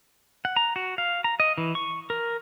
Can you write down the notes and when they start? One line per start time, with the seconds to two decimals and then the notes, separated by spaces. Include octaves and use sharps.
0.45 F#5
0.56 A#5
0.76 F#4
0.98 F5
1.24 A#5
1.40 D#5
1.58 E3
1.75 C#6
2.10 A#4